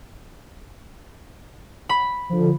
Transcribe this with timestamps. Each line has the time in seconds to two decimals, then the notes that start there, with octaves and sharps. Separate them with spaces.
1.89 B5
2.29 D3 F3